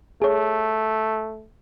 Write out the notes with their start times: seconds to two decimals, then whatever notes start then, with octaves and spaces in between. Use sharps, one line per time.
0.22 A3 G#4 C#5